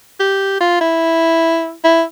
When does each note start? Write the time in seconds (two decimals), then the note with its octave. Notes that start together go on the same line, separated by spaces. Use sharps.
0.20 G4
0.60 F4
0.81 E4
1.84 E4